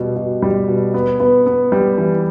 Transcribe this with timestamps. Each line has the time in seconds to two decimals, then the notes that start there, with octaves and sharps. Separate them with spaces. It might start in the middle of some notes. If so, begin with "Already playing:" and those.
Already playing: B2 G3
0.16 B2
0.42 G3
0.68 B2
0.94 B3
1.20 B3
1.46 B3
1.72 G3
1.98 E3